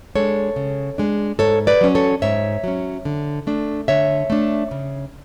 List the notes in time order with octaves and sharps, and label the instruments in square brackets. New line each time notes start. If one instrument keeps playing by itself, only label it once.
[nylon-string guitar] G#3 D4 A4 C#5
C#3
G#3 D4
G#2 A4 C#5
B4 D5
F#3 C#4
A4 C#5
G#2 C#5 E5
F#3 C#4
D3
A3 D4
D3 C#5 E5
A3 D4
C#3